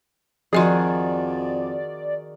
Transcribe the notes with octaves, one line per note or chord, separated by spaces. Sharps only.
F2 D#3 F3 F#4 G#4 D5 D#5 C6